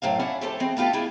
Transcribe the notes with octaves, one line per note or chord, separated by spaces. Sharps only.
F#2 A2 C5 F5
C#4 D4 E4 E5 F#5 G#5
F2 A3 G4 A4 C5 A5
E3 G#3 C4
A3 B3 F4 G4 A4
G#3 A3 D4 E4 F4 G4